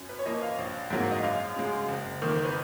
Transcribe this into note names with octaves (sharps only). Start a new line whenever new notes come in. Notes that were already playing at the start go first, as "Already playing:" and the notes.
Already playing: F#2
B4
C#5
F3 A#3 D#5
F5
A#1
G#2 F#3 A#3
D#5
F#2 F5
C#3 G#3
F#1
F2 D#3 A#3
B4